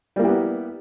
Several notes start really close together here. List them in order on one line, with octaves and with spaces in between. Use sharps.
G3 A#3 E4 G4 B3